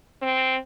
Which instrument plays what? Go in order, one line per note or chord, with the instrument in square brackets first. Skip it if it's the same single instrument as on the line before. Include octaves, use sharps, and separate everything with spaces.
[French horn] C4